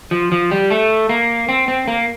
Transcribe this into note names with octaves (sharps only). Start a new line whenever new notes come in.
F3
F3
G3
A3
A#3
C4
C4
A#3